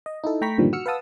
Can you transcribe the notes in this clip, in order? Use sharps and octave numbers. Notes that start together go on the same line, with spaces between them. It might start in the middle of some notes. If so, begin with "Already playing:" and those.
D#5
D#4 E4 A4
A3 G5 A#5 B5 C#6 B6
G2 A#2 D3 D#3 F3 G3
F#4 E6 F6 C#7
B4 F5 F#5 A5 D#6 E6